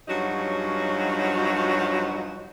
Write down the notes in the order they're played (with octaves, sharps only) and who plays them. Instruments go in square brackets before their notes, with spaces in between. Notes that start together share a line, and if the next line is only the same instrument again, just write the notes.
[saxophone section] G2 F3 F#3 C#4 D#4 F#4